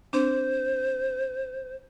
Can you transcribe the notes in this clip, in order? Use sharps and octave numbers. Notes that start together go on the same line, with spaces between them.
C4 D4 C5